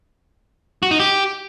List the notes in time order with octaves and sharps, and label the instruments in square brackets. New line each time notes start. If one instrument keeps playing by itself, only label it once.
[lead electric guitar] F#4
D#4
G4